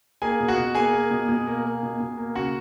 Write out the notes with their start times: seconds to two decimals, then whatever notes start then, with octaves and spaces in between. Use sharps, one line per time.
0.22 A#3 G#4 G#5
0.40 B2
0.48 F#4 F#5
0.57 B2
0.75 A#3 G#4 G#5
0.93 A#3
1.11 B2
1.28 B2
1.47 A#3
1.65 A#3
1.83 B2
2.00 B2
2.17 A#3
2.35 C#3 F#4 F#5